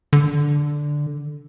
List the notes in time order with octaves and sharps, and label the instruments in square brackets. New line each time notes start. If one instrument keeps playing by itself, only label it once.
[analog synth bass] D3